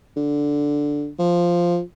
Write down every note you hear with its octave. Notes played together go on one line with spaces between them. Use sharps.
D3
F3